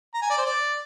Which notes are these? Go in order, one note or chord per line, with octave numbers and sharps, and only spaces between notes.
A#5
G#5
D5
C5
D5